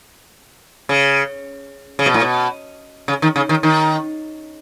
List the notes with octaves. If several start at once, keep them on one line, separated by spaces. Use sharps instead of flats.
C#3
C#3
B2
A2
B2
C#3
D#3
C#3
D#3
D#3